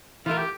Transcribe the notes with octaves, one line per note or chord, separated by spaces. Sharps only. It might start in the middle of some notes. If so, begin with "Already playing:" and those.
E3 A3 E4 F4 A#4
G4